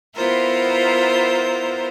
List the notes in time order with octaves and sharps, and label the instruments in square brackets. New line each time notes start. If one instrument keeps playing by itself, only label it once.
[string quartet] B3 E4 F4 A#4 C5